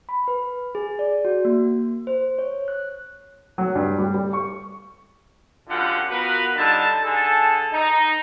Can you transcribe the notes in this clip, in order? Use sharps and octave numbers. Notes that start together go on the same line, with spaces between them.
B5
B4
G#4
D5
F#4
A#3
C5
C#5
F#6
F#3
G2
G3
G3
C#6
F#2 D3 F4 G4 F#5
B3 F4 F#4 A#4 B4
D3 G3 D#4 A5
D3 G#4 A4 A5
D#4